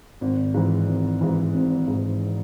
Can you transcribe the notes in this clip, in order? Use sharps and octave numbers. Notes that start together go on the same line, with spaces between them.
G#1
G#2 E3
G#1
G#2 E3
G#1
G#2 E3